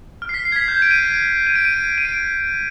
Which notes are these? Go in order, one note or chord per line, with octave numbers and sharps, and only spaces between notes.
F6
C7
B6
C7
G#6
B6
G6
D7
D#7
D7
D#7
D7
D#7
D#7
D7